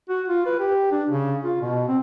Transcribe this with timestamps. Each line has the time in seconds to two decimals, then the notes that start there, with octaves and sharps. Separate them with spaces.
0.09 F#4
0.28 F4
0.46 B4
0.60 G4
0.92 D4
1.10 C#3
1.44 F4
1.61 B2
1.88 C4